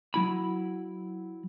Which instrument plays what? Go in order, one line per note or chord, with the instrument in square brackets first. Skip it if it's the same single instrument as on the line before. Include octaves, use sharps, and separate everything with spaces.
[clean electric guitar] F#3 E4 B5